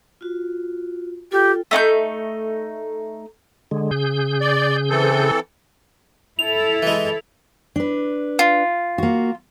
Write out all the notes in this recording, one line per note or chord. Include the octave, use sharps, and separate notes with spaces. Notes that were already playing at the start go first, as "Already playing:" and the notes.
F4 F#4
F4 G4 A4 G5
A3 D#4 G5 G6
D3 G#3
C#3 G#4 G6
D5
E3 C4 A4
E4 A4 F7
E3 G#3
D4 B4
F4
A#3 F#4